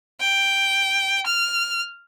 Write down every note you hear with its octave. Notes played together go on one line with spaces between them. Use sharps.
G5
F6